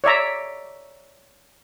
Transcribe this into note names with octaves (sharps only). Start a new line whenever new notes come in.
C#5 D5 E5 A#5